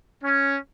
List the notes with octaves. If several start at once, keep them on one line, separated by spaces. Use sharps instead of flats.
C#4